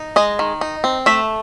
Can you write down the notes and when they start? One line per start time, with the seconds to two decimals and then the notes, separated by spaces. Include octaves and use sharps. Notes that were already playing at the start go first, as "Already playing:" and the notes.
Already playing: D#4
0.16 G#3 D#5
0.39 D#3
0.61 D#4
0.84 C4
1.06 A3 E5